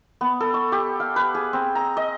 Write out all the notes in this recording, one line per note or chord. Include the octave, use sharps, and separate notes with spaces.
B3
A4
C#6
G4
F5
B4
G#4
C4
A#5
D#5